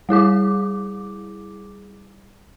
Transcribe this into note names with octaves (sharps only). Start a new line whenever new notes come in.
G3 E4 G#4 D6